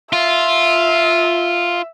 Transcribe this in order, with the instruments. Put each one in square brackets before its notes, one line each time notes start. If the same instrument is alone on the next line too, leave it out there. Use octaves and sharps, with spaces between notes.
[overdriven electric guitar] F4 [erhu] E5